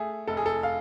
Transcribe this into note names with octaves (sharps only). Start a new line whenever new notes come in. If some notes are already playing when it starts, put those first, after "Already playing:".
Already playing: A3 G#4
F1 A4
G#4
A4
F5